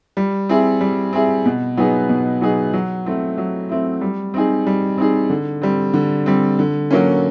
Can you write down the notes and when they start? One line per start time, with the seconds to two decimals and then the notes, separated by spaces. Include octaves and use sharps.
0.17 G3
0.49 C4 E4 G#4
0.81 G3
1.13 C4 E4 G#4
1.45 B2
1.77 F#3 B3 D#4 G#4
2.09 B2
2.41 F#3 B3 D#4 G#4
2.73 F#3
3.05 A3 C4 E4
3.38 F#3
3.69 A3 C4 E4
4.01 G3
4.34 C4 D#4 G#4
4.67 G3
4.98 C4 D#4 G#4
5.30 D3
5.62 G3 C4
5.94 D3
6.26 G3 C4
6.59 D3
6.91 F#3 A#3 C#4